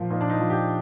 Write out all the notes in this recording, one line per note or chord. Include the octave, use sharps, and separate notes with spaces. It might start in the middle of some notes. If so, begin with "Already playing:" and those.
Already playing: A#2 F3 F4
A#2 D#4
D4
D#4
F3
G4